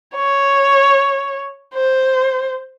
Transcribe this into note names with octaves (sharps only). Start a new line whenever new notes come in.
C#5
C5